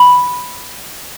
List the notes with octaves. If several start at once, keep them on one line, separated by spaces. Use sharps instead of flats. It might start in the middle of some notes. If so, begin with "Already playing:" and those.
Already playing: B5